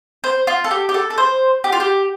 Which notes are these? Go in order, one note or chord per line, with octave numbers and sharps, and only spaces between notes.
C5
F4
A4
G4
G4
A4
A4
C5
G4
F4
G4